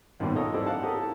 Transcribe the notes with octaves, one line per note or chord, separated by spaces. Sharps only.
A1 D#2 G#2 B2 G3
F4 A4 A#4 C#5 D#5
G#2 C4 D4 E4 G4 A4
F5 F#5 A5
G4 A4 A#4 D#6
E4 A5